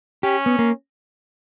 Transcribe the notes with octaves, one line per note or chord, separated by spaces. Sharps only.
C#4 G4
B3
A#3